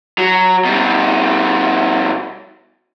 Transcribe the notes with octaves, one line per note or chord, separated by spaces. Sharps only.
F#3
B2 G3